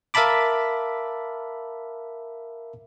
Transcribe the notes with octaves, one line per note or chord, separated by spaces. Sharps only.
A#4 E5 F5 A5 B5 D6